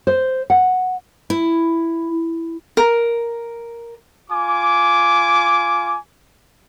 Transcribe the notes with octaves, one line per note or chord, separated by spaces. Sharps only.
C5
F#5
E4
A#4
F4 G#5 D6